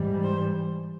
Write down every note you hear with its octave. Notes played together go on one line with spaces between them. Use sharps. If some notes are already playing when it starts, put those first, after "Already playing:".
Already playing: G#2 E3 G3
C5